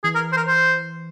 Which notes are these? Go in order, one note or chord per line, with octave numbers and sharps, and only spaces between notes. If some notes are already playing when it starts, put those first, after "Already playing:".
E3 G#4
A#4
C5
A#4
C5